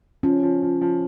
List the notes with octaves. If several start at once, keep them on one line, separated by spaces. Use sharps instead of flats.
F3 C#4
F3
F3
F3